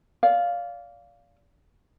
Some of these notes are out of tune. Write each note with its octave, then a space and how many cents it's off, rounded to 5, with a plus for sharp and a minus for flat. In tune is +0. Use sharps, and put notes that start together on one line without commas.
D5 -30 F5 +0